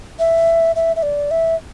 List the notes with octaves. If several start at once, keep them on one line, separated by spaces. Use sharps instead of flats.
E5
E5
E5
D5
E5